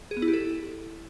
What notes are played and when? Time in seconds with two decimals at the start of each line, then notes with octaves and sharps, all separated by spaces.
0.11 G#4
0.17 B3
0.22 E4
0.28 G4
0.33 A4